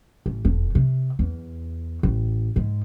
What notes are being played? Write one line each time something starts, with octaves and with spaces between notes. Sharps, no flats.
A1
E1 F2
C3
E2
A1
G#2